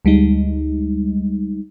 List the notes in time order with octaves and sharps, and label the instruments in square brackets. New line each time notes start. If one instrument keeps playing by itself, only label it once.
[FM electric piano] D2 G3 G#3 D#4